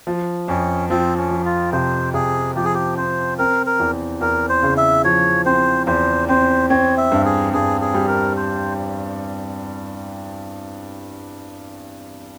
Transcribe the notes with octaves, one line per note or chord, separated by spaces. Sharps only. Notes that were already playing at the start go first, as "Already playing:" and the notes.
F3
F2 C#4
F3 C4
C#4
F3
F4
C3 C5
C3 G#4
F3 G4
G#4
G4
C4 C5
C4 A#4
A#4
E2
E2 A#4
C5
C#3
E5
F3 C#5
C4 C5
E2 C5
C4 C5
C4 C#5
E5
G2
G#4
G2 G#4
G#4
G3
A#4
C5